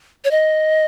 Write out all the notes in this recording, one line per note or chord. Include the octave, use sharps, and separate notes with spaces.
C#5
D#5